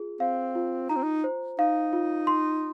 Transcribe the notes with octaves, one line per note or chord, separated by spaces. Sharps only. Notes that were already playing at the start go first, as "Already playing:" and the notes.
Already playing: F4 G#4
C4 F5
F4
D#4 A#5
C4
D#4
C5
D#4 F5
F4
C6